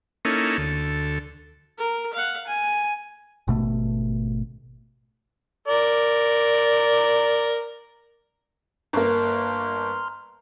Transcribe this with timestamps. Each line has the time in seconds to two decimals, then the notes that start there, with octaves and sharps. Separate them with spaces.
0.25 A#3 C#4 D#4 E4 A4
0.58 D2 A4
1.78 A#4
2.13 F5 F#5
2.47 G#5
3.48 G#1 B2 A3
5.68 A#4 D5
8.93 G1 A#3 A#5 C6 F6